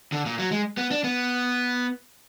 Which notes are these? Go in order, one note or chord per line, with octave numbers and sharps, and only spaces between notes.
D3
A#2
F#3
G#3
B3
D4
B3